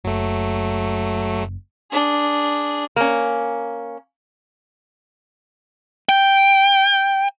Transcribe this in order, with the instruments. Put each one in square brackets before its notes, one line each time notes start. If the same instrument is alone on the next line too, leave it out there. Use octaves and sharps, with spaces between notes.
[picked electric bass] F#1 [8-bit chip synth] F#3 A3
[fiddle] D4 G#4
[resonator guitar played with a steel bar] A#3 C#4
[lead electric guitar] G5